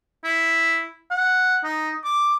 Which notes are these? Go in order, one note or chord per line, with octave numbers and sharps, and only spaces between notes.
E4
F#5
D#4
D6